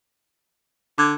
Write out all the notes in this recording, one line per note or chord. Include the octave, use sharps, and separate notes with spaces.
D3 D6 G#6